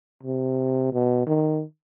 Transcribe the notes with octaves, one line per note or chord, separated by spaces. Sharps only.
C3
B2
D#3